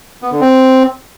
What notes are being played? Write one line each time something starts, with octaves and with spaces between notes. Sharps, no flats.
B3
D3
C4